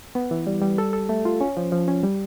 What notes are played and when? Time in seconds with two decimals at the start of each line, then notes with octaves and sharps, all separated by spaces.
0.15 B3
0.31 E3
0.46 G3
0.62 G3
0.78 A4
0.93 A4
1.09 A3
1.25 F4
1.40 C#4
1.57 F3
1.72 F3
1.88 C#4
2.03 G3